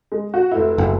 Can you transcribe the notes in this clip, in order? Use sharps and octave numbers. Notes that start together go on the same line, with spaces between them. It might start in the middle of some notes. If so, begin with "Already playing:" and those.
G#3
F#4
F1 E4
F#1